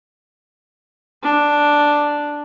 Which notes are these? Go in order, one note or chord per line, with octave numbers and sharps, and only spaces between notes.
D4